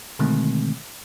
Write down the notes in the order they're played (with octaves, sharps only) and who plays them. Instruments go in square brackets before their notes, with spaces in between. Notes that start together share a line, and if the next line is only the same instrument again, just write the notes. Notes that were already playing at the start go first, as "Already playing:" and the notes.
[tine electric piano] B2 D3 D#3 G#3 A3 C4